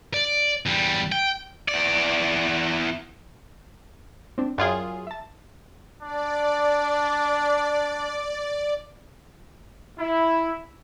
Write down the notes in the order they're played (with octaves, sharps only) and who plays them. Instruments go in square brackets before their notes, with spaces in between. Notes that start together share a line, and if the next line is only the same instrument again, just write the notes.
[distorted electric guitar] D5
E2 G3
G5
E2 D5
[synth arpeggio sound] C4 D4
[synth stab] F#2 F4 G#4 [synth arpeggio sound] D5 G5 G#5
[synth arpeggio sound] E5 A5
[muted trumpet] D4 [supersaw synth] D5
[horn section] E4